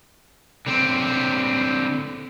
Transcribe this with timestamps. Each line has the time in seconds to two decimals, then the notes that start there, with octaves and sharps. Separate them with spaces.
0.67 D3 C4